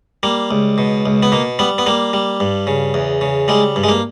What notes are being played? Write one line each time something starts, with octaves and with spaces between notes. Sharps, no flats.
G3 A#3
C#2
B2
C#2
B3
B2 A#3
G3 B3
B3
G3 A#3
G3
G2
C#3
E2
C#3
G3 G#3
G2
G#3
A#3